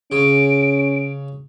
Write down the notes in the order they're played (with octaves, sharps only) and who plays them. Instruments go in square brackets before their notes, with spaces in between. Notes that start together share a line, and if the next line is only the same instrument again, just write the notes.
[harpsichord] C#3 [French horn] C#4 [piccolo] D7